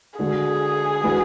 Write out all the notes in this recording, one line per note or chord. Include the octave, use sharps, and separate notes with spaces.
D3 G#3 D4 F#4 G#4
E3 G#3 D4 F#4 B4